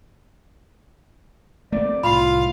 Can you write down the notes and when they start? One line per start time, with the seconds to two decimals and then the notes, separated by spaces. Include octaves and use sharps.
1.72 A3 B3 C4 D5
2.03 C2 A2 F4 F5 B5